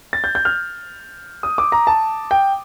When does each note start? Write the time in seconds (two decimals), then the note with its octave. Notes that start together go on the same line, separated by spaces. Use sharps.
0.13 A6
0.24 G6
0.35 G6
0.45 F6
1.43 D#6
1.58 D6
1.72 A#5
1.87 A5
2.31 G5